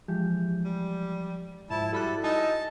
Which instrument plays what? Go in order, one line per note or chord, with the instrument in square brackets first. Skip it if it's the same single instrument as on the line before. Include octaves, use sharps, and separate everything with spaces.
[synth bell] E3 G#3 G4 [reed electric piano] F3
[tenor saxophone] G3
[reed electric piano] G#2 [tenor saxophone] F3 [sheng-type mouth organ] E4 A5 [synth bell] E7
[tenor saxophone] G3 [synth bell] E4 B5 F#6 [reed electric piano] F#4 [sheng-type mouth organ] A4
[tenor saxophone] D#4 [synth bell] G#5 E6 [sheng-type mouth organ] A5